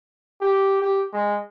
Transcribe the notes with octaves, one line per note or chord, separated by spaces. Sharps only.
G4
G4
G#3